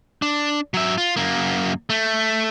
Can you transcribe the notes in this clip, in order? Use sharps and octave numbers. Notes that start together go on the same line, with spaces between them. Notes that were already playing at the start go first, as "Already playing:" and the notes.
D4
F#3 E5
F4
F#2 A#3
A3